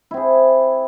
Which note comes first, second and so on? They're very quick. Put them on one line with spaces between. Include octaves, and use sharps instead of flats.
E4 C4 G#4